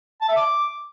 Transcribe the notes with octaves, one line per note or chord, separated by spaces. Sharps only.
A5
E5
D6